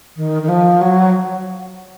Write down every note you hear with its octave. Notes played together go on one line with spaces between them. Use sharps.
D#3
D#3
F3
F#3